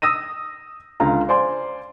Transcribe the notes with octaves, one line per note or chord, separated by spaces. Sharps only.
D#6 E6 A#6 D#7
C#2 D3 F4 A#5
C5 D5 G#5 C6